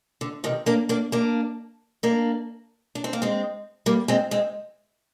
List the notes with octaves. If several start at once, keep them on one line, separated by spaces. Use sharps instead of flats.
D3
C3 D#3
A#3 D4
A#3 D4
A#3 D4
A#3 D4
D4
C4
A#3
G#3 C4
G3 A#3
G#3 C4
G#3 C4